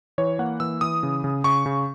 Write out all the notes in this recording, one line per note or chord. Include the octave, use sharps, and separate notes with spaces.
E3 C#5
A#3 F#5
E3 E6
E3 D#6
C#3
C#3
C#3 C#6
C#3